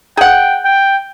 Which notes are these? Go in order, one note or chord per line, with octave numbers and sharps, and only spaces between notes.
G#4 F#5 G5
G5